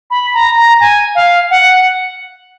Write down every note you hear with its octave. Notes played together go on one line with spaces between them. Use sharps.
B5
A#5
A#5
G#5
F5
F#5